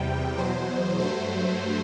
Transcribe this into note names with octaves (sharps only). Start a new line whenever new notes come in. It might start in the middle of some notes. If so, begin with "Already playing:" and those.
Already playing: E2 C3 G3 G5
E2 B2 F#3 C5
G2 F#3 A3 C5